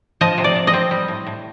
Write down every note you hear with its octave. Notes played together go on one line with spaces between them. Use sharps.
F3 D#5
C3
D5
C3
D#5
C4
G3
A2
A2